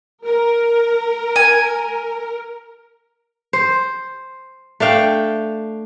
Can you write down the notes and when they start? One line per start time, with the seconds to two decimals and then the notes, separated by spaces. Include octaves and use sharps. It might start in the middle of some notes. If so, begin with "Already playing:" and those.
0.25 A#4
1.36 G#5
3.53 C5
4.80 A3 D4 F5 G5